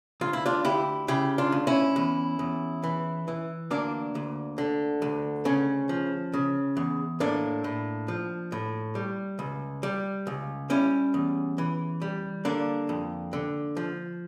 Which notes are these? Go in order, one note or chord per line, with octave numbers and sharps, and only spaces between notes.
D2 F4
E4
D4 F4
D2 E4 G4
C#3 E4 G4
D4 F4
D2
C#4 E4
E2
E2
E3
E3
D2 A#3 D4
D2
D3
D2
C#3 C#4
F3
C#3
E2
A2 A#3 D4
A2
F3
A2
G3
C#2
G3
C#2
G3 C#4 E4
E2
E3
G3
D3 A#3 D4
F2
D3
F3